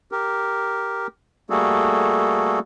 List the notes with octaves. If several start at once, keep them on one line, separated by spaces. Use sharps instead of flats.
G4 A#4
G3 A3 A#3 F#4 G#4 A4